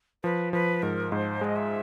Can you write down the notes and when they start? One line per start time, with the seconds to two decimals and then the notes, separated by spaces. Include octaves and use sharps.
0.24 F3 B4
0.53 F3 B4
0.82 G#2 A#4
1.12 G#2 C5
1.41 G#3 D#5
1.56 E5